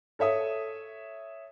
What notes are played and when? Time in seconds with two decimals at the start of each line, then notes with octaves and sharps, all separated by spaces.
0.19 A4 C#5 E5 D#6